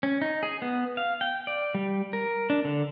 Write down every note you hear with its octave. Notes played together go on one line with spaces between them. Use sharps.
C#4
D#4
G#4
B3
F5
G5
D5
G3
A#4
D4
D3